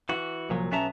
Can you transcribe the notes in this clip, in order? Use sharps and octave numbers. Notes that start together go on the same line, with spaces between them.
E3 F#4
C2 A#2 F3 F#3
B1 B3 C#4 E5 A5 A#5